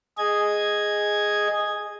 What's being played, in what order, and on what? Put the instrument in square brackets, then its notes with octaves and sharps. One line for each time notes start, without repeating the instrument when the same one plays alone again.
[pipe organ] G#4 D#5 G#6